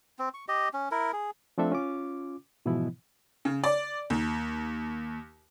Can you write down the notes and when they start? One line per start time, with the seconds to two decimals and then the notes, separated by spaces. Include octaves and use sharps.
0.19 C4
0.34 C#6
0.48 G4 D#5
0.74 C#4
0.91 E4 A#4
1.13 G#4
1.58 F3 A3 C4 D4 A4 E5
1.72 C#4 F4 D6
2.65 G#2 B2 E3 F3 B3 E4
3.45 C#3
3.64 D5
4.10 D#2